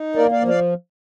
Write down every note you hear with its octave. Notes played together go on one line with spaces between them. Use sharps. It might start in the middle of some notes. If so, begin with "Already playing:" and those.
Already playing: D#4
A#3 A#4 D5
D5 F5
F3
D5 F5